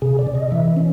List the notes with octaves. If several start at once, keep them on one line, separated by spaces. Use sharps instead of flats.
C3 G#4
D5
C3
D#5
E3 E5
C#4